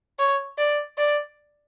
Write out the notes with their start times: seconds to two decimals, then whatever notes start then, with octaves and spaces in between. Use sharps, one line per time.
0.19 C#5
0.58 D5
0.98 D5